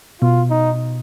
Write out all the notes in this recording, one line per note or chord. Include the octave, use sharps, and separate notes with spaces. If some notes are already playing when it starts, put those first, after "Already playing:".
B2 F4
D#4